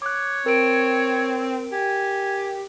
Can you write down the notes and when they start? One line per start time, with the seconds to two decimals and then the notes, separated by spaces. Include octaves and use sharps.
0.02 C#5 D6 F#6
0.46 C4 A#4 D7
1.72 G4 G#5